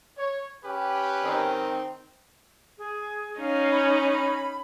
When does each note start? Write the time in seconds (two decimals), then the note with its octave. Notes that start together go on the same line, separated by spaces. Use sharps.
0.17 C#5
0.64 C#4 G4 B4
1.24 D#3 C4 D#4
2.78 G#4
3.39 C#4 D#4 F5
3.71 B5